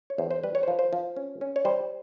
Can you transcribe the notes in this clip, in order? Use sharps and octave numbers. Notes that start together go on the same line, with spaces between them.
C#5
E2 C5
C5
G3 B4
C#5
C5
F3 B4
C5
F3
C#4
C#4
C#5
G3 C5